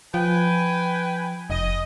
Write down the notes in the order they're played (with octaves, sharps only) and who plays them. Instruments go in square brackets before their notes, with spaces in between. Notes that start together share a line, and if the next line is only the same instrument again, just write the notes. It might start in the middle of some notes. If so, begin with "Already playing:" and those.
[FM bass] F3 [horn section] B4 G5 G#5
[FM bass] F1 [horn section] D#5